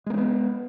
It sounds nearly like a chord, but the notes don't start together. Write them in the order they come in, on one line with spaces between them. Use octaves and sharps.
G#3 A#3 C#4 B3